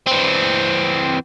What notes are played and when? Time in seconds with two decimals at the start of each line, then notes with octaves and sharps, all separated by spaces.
0.07 E3 C4